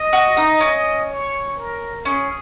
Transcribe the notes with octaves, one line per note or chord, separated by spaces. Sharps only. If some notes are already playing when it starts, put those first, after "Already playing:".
Already playing: D#5
F#4
D#4
C#4
C#5
A#4
C#4 G#4